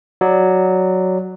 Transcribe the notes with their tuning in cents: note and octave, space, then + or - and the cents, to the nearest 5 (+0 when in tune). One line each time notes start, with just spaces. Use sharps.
F#3 +0 D5 +10